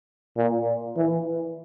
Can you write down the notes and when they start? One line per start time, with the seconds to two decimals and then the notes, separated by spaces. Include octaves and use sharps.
0.37 A#2
0.97 E3